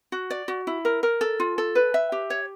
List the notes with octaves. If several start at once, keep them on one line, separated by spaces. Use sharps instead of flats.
F#4
D5
F#4
E4
A#4
A#4
A4
F4
A4
B4
E5
G4
C#5